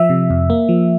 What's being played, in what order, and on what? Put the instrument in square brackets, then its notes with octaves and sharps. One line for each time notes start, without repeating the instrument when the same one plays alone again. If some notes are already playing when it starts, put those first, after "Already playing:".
Already playing: [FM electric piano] F3 E5
C3
F2
A#3
F3